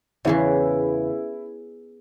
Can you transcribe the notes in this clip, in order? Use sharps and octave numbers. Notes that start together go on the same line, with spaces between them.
E2 C#3 E3 E4